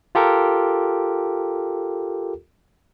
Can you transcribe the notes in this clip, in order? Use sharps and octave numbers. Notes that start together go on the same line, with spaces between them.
F4 G4 A4 A#4